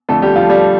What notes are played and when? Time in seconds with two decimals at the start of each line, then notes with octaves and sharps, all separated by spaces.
0.09 F2 D3 F3 A3 A4
0.22 G3 G4
0.36 F3 F4
0.49 G3 G4